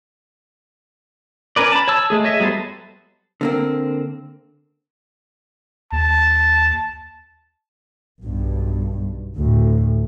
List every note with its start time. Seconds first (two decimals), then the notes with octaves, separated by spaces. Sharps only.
1.56 C#4 A#4 B4 D5
1.72 A5 B5
1.88 C#5 A5 E6
2.10 G#3 A3 G#4
2.24 C#5 D#5 E5
2.40 F#3 G3 B3 A4 C5
3.41 D3 A#3 C4
5.92 D#2 A5
8.23 B1 G2
9.37 D2 A2